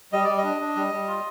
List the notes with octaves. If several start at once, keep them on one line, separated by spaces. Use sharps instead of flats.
G3 D#5
G3 D5
D#5
D4
D4
G3
G3
F4